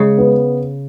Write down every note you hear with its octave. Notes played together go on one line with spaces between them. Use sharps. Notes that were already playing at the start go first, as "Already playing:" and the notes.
Already playing: C#3 G#3
B3